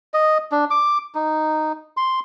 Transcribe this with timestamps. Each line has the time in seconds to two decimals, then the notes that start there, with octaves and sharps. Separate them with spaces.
0.14 D#5
0.52 D4
0.70 D6
1.15 D#4
1.97 C6